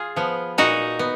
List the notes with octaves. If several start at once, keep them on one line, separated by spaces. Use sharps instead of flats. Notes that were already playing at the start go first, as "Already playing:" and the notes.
Already playing: F4 G#4
F3 B3
A#2 D#4 F#4
B3